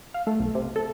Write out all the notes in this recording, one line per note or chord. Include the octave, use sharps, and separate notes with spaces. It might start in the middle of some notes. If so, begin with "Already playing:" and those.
F5
A3
B1
C3
A4